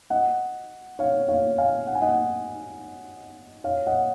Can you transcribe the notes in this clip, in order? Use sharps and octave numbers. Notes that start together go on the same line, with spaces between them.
D#5 F#5
C#5 F5
C#5 F5
F5 G#5
F#5
G#5
D#5 F#5
C#5 F5
D#5 F#5